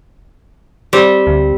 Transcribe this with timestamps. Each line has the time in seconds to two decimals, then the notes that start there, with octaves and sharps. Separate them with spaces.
0.93 G3 C4
1.27 D2